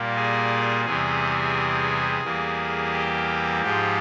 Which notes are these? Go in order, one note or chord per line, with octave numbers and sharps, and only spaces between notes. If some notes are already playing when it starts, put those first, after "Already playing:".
Already playing: A#2 G3 A#3
G#4
E2 C3 E3 G3 G#4
E2 E3 G3 A#3
G4
G#2 F3 G#3 G4